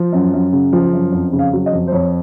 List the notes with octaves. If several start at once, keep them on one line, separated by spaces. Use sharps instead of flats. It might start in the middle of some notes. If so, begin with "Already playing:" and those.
Already playing: F3
F#2
F#2
C#3
F3
F#2
F2
C#3
F5
F#3
D#5
F2
C5
F2 C#5